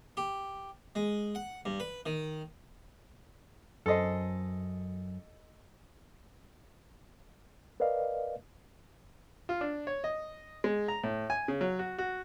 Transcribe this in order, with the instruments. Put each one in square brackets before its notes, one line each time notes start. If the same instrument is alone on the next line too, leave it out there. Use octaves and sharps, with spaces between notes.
[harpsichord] G4
G#3
F#5
G2
B4
D#3
[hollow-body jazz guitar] F#2 C5 [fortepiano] A4 D#5
[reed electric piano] A#4 B4 D5 D#5 F5
[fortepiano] F4
D4
C#5
D#5
G#3
A#5
A2
G#5
C#3
F#3
F#4
F#4